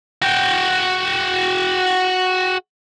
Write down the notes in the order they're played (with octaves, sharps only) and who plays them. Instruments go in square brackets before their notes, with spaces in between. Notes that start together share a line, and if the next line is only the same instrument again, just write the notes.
[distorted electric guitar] F#4 G5